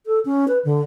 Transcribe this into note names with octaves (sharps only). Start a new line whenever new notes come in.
A4
C#4
B4
D3